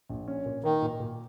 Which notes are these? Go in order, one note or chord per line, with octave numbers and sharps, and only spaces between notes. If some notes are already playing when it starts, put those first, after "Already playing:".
A#1
C#4
A#2
D#3 A#3
A#2
A#2